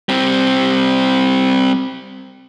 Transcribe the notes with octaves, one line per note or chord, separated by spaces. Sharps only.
G3 C4